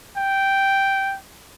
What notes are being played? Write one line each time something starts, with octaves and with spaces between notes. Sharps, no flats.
G5